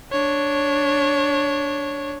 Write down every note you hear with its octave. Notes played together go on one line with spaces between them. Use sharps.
D4 C#5